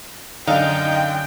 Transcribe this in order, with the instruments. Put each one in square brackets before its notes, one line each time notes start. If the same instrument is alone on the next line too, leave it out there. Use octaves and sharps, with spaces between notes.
[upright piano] F#2 D3 [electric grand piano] D#4 [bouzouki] F5 [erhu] G5